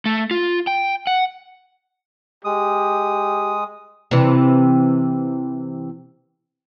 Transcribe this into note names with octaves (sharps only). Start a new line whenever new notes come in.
A3
F4
G5
F#5
G#3 G4 D#6
C3 E3